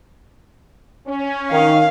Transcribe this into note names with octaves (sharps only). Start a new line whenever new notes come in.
C#4
D#3 F5